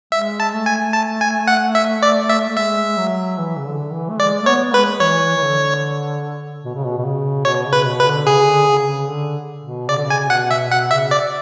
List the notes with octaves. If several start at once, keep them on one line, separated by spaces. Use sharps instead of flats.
G#3 E5
A5
A3
G#5
A5
G#5
F#5
E5
D5
E5
A3
G#3 E5
F#3
E3
C#3
D3
E3
A3
G#3 D5
A3
B3 C#5
G#3 B4
E3 C#5
E3
D3
B2
C#3
B2
B2
C#3
B2 C#5
C#3
B4
B2
C#3 B4
D3
C#3 G#4
D3
C#3
C#3
D3
B2
C#3 D5
D3
C#3
G#5
B2 F#5
E5
B2 F#5
C#3 E5
D5